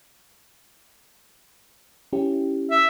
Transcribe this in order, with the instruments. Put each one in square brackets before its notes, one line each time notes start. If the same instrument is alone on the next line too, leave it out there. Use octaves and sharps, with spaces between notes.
[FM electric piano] C#4 E4 G4
[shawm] E5